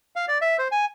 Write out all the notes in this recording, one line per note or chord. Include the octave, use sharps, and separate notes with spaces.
F5
D5
E5
C5
G#5